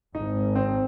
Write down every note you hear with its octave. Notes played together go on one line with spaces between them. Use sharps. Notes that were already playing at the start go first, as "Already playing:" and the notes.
G#1 G#2 D#4
C4